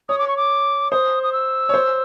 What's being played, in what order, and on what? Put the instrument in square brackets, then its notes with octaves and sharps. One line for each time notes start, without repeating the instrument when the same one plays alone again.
[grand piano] C#5 [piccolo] D#6
[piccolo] D6
C#6
D6
[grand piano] C5 [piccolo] D#6
[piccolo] D#6
E6
[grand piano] C#5
C5